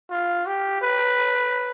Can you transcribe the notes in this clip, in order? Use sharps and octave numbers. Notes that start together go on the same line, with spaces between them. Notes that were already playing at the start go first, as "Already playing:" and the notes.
F4
G4
B4